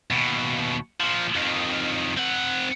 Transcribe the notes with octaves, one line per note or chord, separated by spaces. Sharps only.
D#2 B2
A#2 F3
F2 D#3
C4 F#5